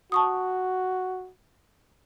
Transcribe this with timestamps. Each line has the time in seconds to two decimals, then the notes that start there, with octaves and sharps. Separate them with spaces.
0.12 F#4 A5 C#6 D#6